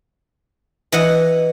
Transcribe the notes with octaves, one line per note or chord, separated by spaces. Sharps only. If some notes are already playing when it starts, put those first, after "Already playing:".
E3 D#5 F#5